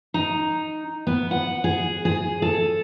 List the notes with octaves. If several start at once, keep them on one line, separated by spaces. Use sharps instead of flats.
D#4
B3
F#5
G#4
G#4
A4